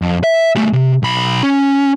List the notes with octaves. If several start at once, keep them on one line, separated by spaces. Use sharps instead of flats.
F2
E5
G3 A3
C3
B1 B5
C#4